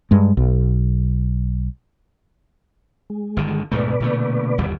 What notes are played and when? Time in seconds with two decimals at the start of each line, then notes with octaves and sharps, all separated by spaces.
0.11 G2 G#3
0.37 B1
3.10 G#3
3.37 G1 D3 D#3
3.72 D2 G#2 B2 A3 B4 D5
4.00 A#2 D3 A3
4.58 G1 D#2 G3